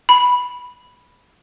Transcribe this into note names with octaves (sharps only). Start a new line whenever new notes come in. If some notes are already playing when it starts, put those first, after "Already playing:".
B5